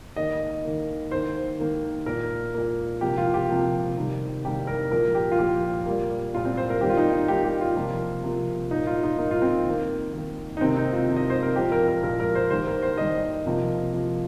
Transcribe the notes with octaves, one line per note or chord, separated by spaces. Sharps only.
D#3 A#3 D#5
D#3 A#3
D#3 A#3 C5
D#3 A#3
A#2 A#3 A#4
A#2 A#3
C3 F3 A#3 G4
F4
G4
C3 F3 A#3
C3 D#3 G3 A#3
C3 D#3 G3 A#3 G4
A#4
A#2 F3 A#3 A#4
G4
F4
A#2 F3 A#3 G4
A#2 G3 A#3
A#2 G3 A#3 F4
C4
C5
A#4
D#3 G3 A#3 G4
F4
D#4
D#4
D#3 G3 A#3 G4
G4
F4
C3 F3 A#3
C3 F3 A#3
A#2 A#3 D#4
F4
D#4
A#2 A#3 D#4
F4
C4
D#3 A#3
D#3 A#3
D#4
C3 D#3 A#3 C4
D#4
F4
C3 D#3 A#3
D#5
C5
A#4
A#2 F3 A#3 G4
A#4
A#4
A#2 F3 A#3 A#4
A#4
C5
D#3 G3 A#3 C5
A#4
C5
D#3 G3 A#3 D#5
C3 F3 A#3
C3 F3 A#3